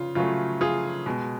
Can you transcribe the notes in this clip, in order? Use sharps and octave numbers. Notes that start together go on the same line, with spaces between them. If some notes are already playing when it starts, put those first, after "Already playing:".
Already playing: C#3 F4
C#3 F#3 A3 F4
F4 G#4
B2 G#3